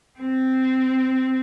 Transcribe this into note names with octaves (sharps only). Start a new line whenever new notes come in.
C4